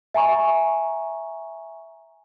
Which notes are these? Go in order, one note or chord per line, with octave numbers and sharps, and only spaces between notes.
E5 G#5 A#5 C#6